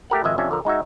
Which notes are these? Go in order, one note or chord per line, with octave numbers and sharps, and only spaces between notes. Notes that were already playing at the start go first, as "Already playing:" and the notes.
A3 G4 A#4 F#5
G#1 F2 G#3 D#5 E5
F2 C3 C#4 D4 E5
D3 F3 A#4
G#3 D#4 F#4 E5